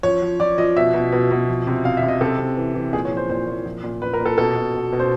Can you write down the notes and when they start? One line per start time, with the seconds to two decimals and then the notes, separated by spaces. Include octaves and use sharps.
0.03 F3 C#5
0.22 F3
0.40 F3 D5
0.58 F3 D#5
0.76 B2 E5
0.94 B2
1.12 B2
1.31 B2
1.48 F3
1.67 C3
1.84 C3 F5
1.97 E5
2.02 C3
2.08 D#5
2.21 C3 A4
2.38 C3
2.57 E3
2.75 E3
2.93 A#2 G#4
3.05 C#5
3.11 F3
3.17 C5
3.29 A#2 C5
3.47 A#2
3.65 F3
3.84 A#2
4.02 A#2 B4
4.13 A#4
4.20 A#2
4.25 A4
4.38 B2 A4
4.55 B2
4.74 B2
4.92 B2
5.00 C5